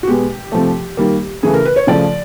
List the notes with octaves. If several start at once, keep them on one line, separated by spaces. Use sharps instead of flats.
F#4
B2 G#3 B3 G4
C3 F3 A3
D#3 G3 A#3
C#3 E3 A3 G#4
A#4
B4
C#5
C#3 F3 A3 D5